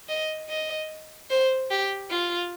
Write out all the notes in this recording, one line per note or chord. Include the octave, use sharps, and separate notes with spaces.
D#5
D#5
C5
G4
F4